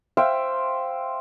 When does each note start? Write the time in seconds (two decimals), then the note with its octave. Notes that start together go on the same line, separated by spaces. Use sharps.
0.17 C5 E5 F5 G5